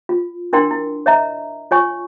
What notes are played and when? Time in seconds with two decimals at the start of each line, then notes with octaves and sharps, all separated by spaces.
0.09 F4
0.53 D4 E4 A#4 G5 C6
0.71 E4
1.06 C#5 D#5 E5 A#5
1.71 F4 C#5 G#5 C#6